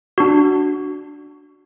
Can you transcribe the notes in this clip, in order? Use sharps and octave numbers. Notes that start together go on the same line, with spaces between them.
D4 F#4